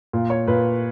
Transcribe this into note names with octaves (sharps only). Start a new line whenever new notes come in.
A#2
C#5
A#2 B4